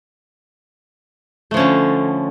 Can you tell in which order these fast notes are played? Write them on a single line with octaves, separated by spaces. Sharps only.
A3 F3 C#4 D3